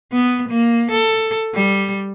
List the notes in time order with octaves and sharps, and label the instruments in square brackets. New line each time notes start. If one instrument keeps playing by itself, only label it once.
[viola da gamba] B3
A#3
A4
G3